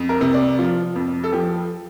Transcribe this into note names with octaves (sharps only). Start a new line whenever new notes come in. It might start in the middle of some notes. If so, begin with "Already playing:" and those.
Already playing: F2
A#4
C3
D5
F3 F4
F2
A4
F3 G4